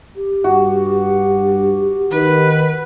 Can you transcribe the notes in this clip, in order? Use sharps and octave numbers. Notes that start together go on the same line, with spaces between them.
G4
G2 F#4
D#3 B4